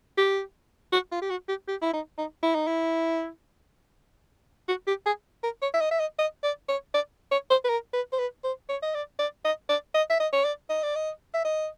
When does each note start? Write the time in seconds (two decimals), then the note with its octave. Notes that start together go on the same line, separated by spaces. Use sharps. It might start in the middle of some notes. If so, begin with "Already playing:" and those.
0.18 G4
0.92 F#4
1.12 F4
1.22 G4
1.30 F#4
1.49 G4
1.68 G4
1.82 E4
1.93 D#4
2.18 D#4
2.43 E4
2.55 D#4
2.67 E4
4.68 F#4
4.87 G4
5.06 G#4
5.43 A#4
5.62 C#5
5.74 E5
5.81 D#5
5.91 E5
6.00 D#5
6.19 D#5
6.44 D5
6.69 C#5
6.94 D5
7.31 C#5
7.50 C5
7.64 B4
7.69 A#4
7.93 B4
8.13 C5
8.19 B4
8.44 C5
8.69 C#5
8.83 D#5
8.95 D5
9.19 D5
9.45 D#5
9.69 D5
9.94 D#5
10.10 E5
10.20 D#5
10.33 C#5
10.45 D5
10.70 D#5
10.83 D5
10.96 D#5
11.34 E5
11.45 D#5